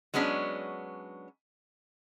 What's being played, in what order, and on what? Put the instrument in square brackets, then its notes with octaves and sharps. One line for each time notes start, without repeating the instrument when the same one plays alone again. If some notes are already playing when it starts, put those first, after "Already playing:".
[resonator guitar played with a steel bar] F#3 G#3 B3 C#4 D4